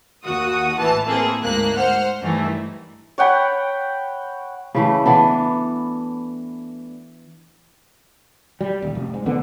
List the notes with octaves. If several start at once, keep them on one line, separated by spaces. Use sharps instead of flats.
D#2 F#4 D#6
A1 E3 A5
A#3 C4 E4 G#4 A4
D2 G#2 A#3 F#6
C5 F#5 F6
G2 D#3 E3 A3
C#5 F#5 G5 B5
C#3 E3 A3
E3 B3 D4
G3
D#1
F1
G#2
F1 D3 B3